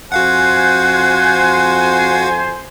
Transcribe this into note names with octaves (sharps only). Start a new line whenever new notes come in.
F2 F#4 C5 F5 F#5 G#5 F#6